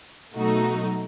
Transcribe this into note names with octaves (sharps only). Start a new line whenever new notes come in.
B2 F#3 A3 D#4 F#4